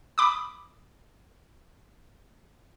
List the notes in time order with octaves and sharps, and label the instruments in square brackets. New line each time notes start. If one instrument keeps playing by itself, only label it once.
[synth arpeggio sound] B5 D6 D#6